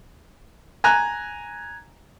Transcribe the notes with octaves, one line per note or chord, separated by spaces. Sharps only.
G#5 A#5 F#6